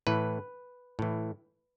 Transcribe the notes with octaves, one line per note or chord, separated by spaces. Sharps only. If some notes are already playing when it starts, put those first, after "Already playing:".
A2 E3 B4
A2 E3